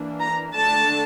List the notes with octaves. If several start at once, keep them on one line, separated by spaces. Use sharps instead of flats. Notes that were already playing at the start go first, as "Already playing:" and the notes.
Already playing: E3 A#3 D4
A#5
D3 A3 D4 A5